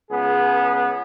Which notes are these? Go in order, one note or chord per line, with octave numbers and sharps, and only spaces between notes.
C#2 B3 G#4